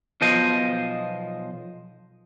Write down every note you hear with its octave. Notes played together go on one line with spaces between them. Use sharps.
B1 B2 F3 C5 D#5